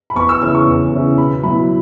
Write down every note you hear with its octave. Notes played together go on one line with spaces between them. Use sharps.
B5
E2 C#6
E6
C#3 E3 C#4 E6
C#6
E2
C#3 E3 C#4
B2 B5
F#3 B3 E4 B5